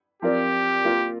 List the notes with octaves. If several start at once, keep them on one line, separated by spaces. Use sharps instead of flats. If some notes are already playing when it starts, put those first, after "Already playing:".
F3 C4 F4 G4 A#4 D5
A#3 F4 A#4